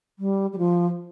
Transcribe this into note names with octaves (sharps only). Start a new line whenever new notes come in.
G3
G3
F3